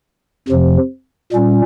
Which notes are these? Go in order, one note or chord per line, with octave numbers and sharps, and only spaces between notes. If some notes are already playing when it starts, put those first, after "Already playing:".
F2 C3 F3
A#2 G3 C#4